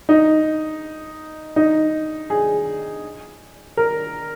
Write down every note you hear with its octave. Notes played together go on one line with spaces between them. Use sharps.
D#4
D#4
G#4
A#4